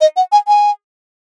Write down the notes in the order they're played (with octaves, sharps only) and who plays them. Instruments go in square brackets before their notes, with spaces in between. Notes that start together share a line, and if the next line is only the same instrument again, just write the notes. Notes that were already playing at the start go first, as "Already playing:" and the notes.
[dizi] D#5
F#5
G#5
G#5